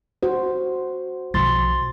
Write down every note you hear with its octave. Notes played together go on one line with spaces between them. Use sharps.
F#4 C5
B1 F3 C6 A6